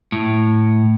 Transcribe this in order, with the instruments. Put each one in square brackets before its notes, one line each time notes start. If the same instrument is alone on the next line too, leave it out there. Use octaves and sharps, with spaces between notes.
[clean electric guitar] A2